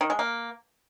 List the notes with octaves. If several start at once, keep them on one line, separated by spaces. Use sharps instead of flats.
D#3
G#3
A#3